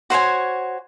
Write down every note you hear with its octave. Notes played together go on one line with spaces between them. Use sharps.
F#4 C5 C#5 G#5